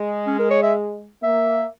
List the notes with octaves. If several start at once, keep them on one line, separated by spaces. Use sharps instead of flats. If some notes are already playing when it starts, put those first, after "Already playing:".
Already playing: G#3
C#4
A#4
C#5
E5
A#3 E5